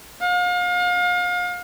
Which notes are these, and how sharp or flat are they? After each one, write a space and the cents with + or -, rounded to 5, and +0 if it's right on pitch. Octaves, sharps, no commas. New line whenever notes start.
F5 +35